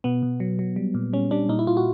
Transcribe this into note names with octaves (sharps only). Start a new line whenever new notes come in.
B2 B3
B2
F#3
F#3
G3
A#2
G3 C#4
G3 D4
A#2 D#4
E4
A#2 F4
F#4